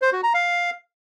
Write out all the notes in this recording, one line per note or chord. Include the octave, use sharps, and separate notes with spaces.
C5
F#4
A#5
F5